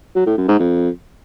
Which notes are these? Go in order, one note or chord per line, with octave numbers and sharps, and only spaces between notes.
F#3
A2
F#2
G#2
F2